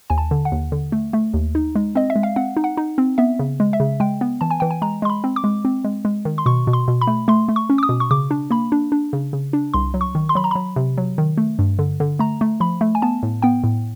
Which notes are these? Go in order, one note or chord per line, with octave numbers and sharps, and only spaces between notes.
D#2 G#5
A5
D3
F#5
D#2
D3
A3
A3
D#2
D#4
G#3
C4 D#5
E5
G#3
F5
C4 F#5
D#4
F#5
D#4
C4
B3 E5
C#3
G#3
E5
C#3
G#3 G5
B3
E3 A5
G#5
E3 G5
G#5
G#3 A#5
G#3 C6
B5
C4
D6
G#3
C4
G#3
G#3
D#3
C6
B2 C#6
B2
C6
B2
B5
A3
A3 C6
A3
C#6
C#4
D6
D#6
B2
C#6
C#3 D6
D4
A#3 B5
D4
D4
C#3
C#3
D4
C2 C6
F#3
C#6
D#3
C6
F#3 B5
A#5
F#3 B5
C3
F#3
D#3
A3
G2
D3
D3
A3 A#5
A3
F3 B5
A3
G#5
B3 A5
A2
B3 G5
A2